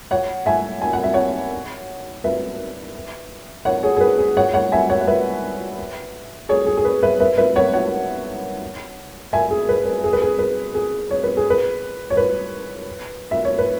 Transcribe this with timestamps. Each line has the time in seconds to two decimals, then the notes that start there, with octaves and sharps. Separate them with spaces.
0.11 C#5 F#5
0.46 E5 G#5
0.81 G#5
0.93 F#5
1.04 E5
1.14 C#5 F#5
2.24 B4 E5
3.65 C#5 F#5
3.83 G#4 C#5
3.96 G#4
4.01 B4
4.18 G#4
4.37 C#5 F#5
4.54 C#5 F#5
4.72 E5 G#5
4.89 C#5 F#5
5.01 F#5
5.07 B4 E5
6.49 G#4 C#5
6.66 G#4
6.77 G#4
6.85 B4
7.02 B4 E5
7.20 B4 E5
7.38 B4 E5
7.56 C#5 F#5
7.73 C#5 F#5
9.33 E5 G#5
9.51 G#4
9.69 B4
9.86 B4
10.04 G#4
10.13 B4
10.22 G#4
10.39 B4
10.75 G#4
11.11 C#5
11.23 B4
11.37 G#4
11.50 B4
12.10 C#5
12.17 B4
13.31 E5
13.45 C#5
13.59 B4